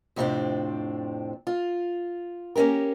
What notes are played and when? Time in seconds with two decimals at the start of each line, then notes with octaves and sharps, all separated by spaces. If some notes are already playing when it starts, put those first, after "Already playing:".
0.16 F2 A2 C3 G#3 C4 D4
1.47 F4
2.56 A#3 C#4 D4 G4 A#4